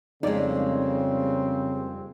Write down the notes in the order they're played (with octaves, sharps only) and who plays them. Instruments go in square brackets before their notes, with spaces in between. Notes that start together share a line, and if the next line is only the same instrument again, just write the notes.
[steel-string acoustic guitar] F2 G#3 [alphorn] C#3 [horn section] G3 A#3 C4 [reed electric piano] D#4 D5